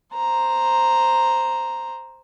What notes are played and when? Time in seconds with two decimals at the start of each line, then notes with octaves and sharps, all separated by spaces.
0.14 C5 A#5